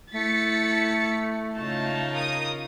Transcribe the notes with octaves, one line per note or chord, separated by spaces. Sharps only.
A3 E4 A6 B6 C#7
C#3 D#4 F4 A5
A#4 D#6